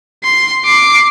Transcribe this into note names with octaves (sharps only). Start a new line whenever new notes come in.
C6
D6 C7